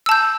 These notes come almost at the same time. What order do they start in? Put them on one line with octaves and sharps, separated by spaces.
E6 A5 G6